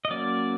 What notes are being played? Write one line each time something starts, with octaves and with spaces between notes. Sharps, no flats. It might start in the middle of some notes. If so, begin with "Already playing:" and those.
D#5
F#3 A#3 C#4 D5